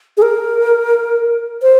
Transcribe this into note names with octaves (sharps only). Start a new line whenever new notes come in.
G#4
A#4
C5